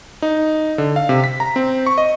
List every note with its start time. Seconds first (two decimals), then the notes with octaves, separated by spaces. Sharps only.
0.22 D#4
0.78 D3
0.96 F5
1.09 C3
1.24 B6
1.40 A#5
1.56 C4
1.86 C#6
1.98 D#5